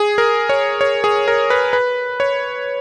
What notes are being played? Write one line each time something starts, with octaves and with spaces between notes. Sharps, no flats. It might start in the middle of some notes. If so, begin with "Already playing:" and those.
Already playing: G#4
A#4
C#5
C#5
G#4
A#4
B4
B4
C#5